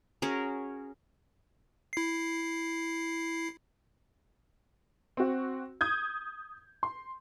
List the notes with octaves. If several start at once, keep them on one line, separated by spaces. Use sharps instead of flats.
C#4 F#4 G#4 A#4
E4 C7
C4 F#4
D#6 G6 G#6
C6